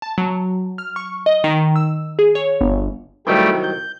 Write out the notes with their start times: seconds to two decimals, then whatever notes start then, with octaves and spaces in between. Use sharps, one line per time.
0.02 A5
0.18 F#3
0.78 F6
0.96 C#6
1.26 D#5
1.44 D#3
1.76 E6
2.19 G#4
2.35 C#5
2.61 G1
3.27 C2 D#3 F#3 G3 A3 G5
3.63 G6